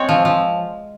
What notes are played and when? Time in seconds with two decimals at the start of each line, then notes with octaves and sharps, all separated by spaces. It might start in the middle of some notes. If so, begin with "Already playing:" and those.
Already playing: G#3 C4 C#5
0.09 F3
0.25 F3